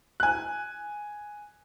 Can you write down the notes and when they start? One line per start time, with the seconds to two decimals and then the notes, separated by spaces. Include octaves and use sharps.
0.20 G#5 F#6